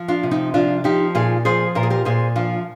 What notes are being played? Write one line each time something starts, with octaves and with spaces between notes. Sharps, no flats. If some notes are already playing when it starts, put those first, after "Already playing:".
Already playing: F3
D4 F4
C3
C4 D#4
F3 D4 F4
F3 D#4 G4
A#2 F4 G#4
F3 G#4 C5
A#2 A#4
G#4
G4 A#4
A#2 G#4 C5
F3 D4 F4